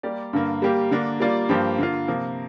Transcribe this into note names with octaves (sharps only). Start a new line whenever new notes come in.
G3 A#3 G4 D5
G2 D3 A#3
G3 A#3 G4
D3 A#3 D4
G3 A#3 F4 D5
G2 F3 A#3 G4 C5
D3 A#3 F4
C3 F3 A#3